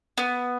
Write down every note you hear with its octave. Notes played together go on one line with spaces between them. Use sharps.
B3